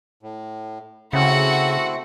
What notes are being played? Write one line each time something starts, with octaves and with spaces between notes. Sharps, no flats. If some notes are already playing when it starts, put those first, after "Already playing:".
A2
C#3 A3 C4 E4 F#4 F#5